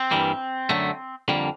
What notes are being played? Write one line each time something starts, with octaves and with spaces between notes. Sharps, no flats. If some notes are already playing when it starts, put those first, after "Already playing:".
Already playing: C4
G2 E3 G3 A#3
F#2 D3 F#3 A3
F2 D3 G3 A#3